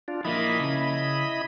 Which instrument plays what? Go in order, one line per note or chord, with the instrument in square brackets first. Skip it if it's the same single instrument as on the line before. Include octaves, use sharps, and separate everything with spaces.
[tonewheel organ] D4 F4
[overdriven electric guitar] F3 A#3 [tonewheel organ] E4 D#5 B5
[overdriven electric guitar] C#3